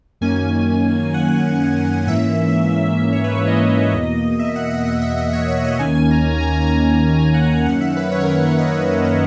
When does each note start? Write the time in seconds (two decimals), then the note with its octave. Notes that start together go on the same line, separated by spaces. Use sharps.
0.21 F#2 D#3 A#3 C#4 G#5
1.14 F#5
2.07 G#2 E3 A#3 C#4 E5
3.00 E5
3.13 C#5
3.24 B4
3.35 C#5
3.47 D#5
3.94 E2 B2 A#3
4.39 E5
4.56 F#5
4.70 F#5
4.87 F#5
5.02 E5
5.18 D#5
5.33 C#5
5.48 C#5
5.64 D#5
5.79 D#2 D#3 A#3 C#4 G#5
5.95 G#5
6.11 A#5
6.40 A#5
6.53 G#5
6.67 A#5
7.19 G#5
7.34 F#5
7.65 F#2 D#3 A#3 C#4 F#5
7.81 E5
7.97 B4
8.12 C#5
8.23 A#4
8.47 A#4
8.58 D#5
8.70 F#5
8.82 C#5
8.93 C#5
9.05 C#5